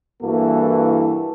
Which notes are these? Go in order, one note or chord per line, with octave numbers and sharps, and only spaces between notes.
G2 E3 A#3 E4 F#4 A4